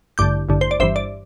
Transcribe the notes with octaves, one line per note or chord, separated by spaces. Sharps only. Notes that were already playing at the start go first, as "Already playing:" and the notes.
A1 G2 D3 D6 G6
A1 G2 D3
C5
D5
G1 G2 E3 C5 E5
D5